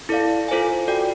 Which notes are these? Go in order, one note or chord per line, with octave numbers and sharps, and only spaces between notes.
E4 A4 D5 F5
F4 A4 C5 F5 G#5
F#4 A4 D5 G5